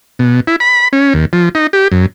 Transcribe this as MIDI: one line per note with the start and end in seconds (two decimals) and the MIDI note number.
0.19 0.40 47
0.47 0.56 64
0.60 0.88 83
0.93 1.13 61
1.14 1.25 39
1.33 1.49 53
1.55 1.67 63
1.73 1.88 67
1.92 2.06 42